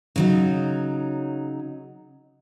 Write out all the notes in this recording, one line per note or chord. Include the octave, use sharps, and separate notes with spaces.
C#3 F#3 D#4